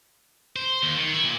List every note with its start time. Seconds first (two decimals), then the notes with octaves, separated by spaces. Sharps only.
0.56 C5
0.83 D#2
0.97 D#3
1.13 E4
1.24 A#2